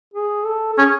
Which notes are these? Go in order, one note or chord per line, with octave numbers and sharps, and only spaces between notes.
G#4
A4
A4
C#4 G#4